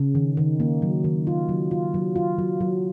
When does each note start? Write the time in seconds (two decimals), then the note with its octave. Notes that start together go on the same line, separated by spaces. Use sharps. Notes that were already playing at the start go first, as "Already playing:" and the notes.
Already playing: C#3
0.15 D#3
0.37 D#3
0.60 A#3
0.82 F#3
1.04 D#3
1.27 F4
1.49 F#3
1.71 F4
1.94 F#3
2.16 F4
2.38 F#3
2.61 F#3